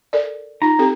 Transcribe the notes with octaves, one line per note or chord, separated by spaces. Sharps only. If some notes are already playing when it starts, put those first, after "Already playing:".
A4 A#4 D5
D#4 F4 A#5
C4 G4 A4